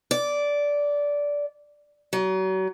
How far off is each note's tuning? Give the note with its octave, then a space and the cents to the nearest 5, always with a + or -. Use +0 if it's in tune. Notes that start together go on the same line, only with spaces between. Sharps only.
D5 -15
F#3 +35